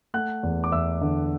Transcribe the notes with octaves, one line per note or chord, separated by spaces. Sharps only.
A3 F#5 F#6
E2
D6
E2 E5 E6
D3